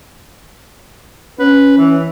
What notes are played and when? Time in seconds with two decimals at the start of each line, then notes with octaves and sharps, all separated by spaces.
1.39 C#4 B4
1.78 E3